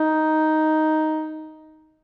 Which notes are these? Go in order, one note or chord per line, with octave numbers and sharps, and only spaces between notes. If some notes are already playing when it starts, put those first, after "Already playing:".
Already playing: D#4